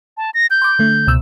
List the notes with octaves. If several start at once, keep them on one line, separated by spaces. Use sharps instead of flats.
A5
A#6
G6
C6 D6
D3 A3
C#2 B2 E6